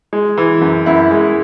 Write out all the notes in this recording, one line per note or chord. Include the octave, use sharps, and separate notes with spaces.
G#3
E3
F#2
F#2 E4
G#3